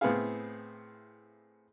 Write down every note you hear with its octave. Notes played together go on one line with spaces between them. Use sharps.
A2 B3 C4 E4 G#4 F5